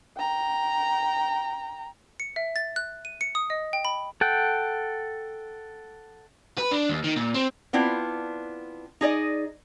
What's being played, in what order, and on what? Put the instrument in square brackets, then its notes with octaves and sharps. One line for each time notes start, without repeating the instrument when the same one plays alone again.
[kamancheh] G5 A#5
[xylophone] C#7
E5
A6
F#6
D#7
C#7
D#6
D#5
G5
B5
[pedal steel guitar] A4 F#5 G5
[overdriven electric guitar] B4
D4
D#2
D#3
A#2
C4
[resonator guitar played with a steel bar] B3 C4 D4 E4 F4
D#4 G#4 D5 D#5